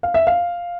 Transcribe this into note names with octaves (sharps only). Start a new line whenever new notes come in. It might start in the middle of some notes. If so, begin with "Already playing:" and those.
F5
E5
F5